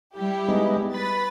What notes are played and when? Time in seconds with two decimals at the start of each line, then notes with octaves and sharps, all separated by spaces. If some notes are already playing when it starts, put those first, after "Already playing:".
0.16 G3 E4 G4
0.49 G#3 B3 D#4
0.94 B4 B5 A6